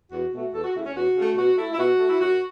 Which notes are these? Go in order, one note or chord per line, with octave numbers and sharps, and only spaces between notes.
E2 F#4
B2 A3 F#4
E2 A4
F#4
C#3 A3 E4
C#4
E2 F#4
C#3 A3
B2 F#4
A3 E4
E4
B2 F#4
A3
E4
F#2 F#4